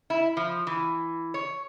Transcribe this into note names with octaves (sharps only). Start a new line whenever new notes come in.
E4
F3
E3
C#5